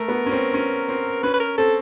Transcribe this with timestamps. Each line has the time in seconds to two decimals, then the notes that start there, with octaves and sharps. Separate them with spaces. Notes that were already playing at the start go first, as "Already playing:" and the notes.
Already playing: A3 A#4
0.08 B3
0.26 C#4
0.32 C4
0.54 C#4
0.89 C4
1.23 C#4 B4
1.34 B4
1.40 A#4
1.58 C4 A4